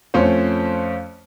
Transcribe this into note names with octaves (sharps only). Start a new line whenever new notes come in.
F2 A3 C#4 F4 C5